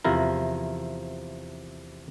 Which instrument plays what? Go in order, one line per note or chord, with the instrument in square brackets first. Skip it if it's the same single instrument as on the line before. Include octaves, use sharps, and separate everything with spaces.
[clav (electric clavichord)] E2 C3 F3 E4 A#4